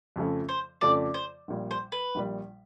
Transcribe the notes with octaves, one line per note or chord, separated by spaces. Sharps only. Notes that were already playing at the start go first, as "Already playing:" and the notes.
F2 C#3 F3 A3
C5
F2 C#3 F3 A3 D5
C5
A#1 A#2 G3
C5
B4
A#1 A#2 G3